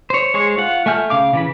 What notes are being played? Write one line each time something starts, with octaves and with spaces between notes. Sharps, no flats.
C5 C#5
G#3 G#4 C5 C#5
F4 F#5
A3 E5 G#5 F6 G6
C#3 F5 D6
C#3 E3 B5